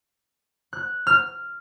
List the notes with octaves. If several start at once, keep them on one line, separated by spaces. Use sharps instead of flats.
F#6
F6